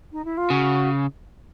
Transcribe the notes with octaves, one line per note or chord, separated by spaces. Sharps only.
D#4
E4
F4
C#3 F#4